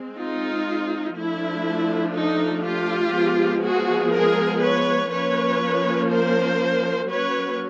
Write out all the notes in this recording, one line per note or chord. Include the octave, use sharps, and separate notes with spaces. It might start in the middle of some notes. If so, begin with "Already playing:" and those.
Already playing: G#3 C4
D#4 F4
F3 A3 D4 E4
D#4
F4 G4
F3 G#3 B3
F#4 G#4
G#4 A#4
B4 C#5
F3 A#3 C#4 B4 C#5
A#4 C5
F#3 A#3 C#4 B4 C#5